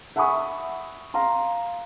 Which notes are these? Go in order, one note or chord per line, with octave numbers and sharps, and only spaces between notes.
E5 F#5 G#5 B5 C#6 D#6
F5 A#5 C6